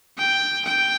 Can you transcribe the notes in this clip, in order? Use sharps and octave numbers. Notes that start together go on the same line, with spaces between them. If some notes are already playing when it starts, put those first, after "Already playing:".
G5
G5